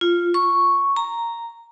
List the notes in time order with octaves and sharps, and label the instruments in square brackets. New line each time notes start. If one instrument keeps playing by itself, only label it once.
[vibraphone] F4
C#6
A#5